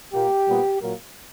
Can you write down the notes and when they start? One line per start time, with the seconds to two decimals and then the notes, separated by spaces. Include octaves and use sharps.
0.13 A#2 A#3 G4
0.47 A#2 G3 B3
0.81 A#2 F#3 A#3